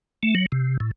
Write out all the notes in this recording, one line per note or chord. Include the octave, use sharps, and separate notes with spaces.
A3
F#3
C3
A2